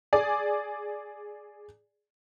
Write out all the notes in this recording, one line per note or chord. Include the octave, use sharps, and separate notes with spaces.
G#4 D5